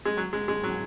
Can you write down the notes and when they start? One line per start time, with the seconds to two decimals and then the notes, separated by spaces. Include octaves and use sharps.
0.05 G#3
0.17 F#3
0.33 G#3
0.48 G#3
0.64 F#3